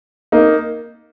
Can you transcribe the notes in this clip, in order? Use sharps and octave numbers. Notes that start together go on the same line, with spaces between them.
A#3 D#4